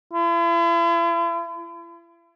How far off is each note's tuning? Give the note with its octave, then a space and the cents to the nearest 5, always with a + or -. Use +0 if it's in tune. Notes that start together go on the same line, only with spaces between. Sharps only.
E4 +45